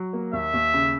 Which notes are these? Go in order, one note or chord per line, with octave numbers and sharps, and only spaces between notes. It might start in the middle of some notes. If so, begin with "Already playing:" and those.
Already playing: F#3
A#3
D#2 E5
D#2
C#3